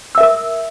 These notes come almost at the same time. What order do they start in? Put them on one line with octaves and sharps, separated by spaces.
E6 E5 A#4 D#6